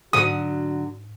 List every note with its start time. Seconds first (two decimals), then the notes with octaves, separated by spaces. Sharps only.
0.13 G#2 D3 F#3 F#4 D#6